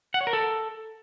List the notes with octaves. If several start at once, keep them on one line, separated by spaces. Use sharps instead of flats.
F#5
C#5
A#4
A4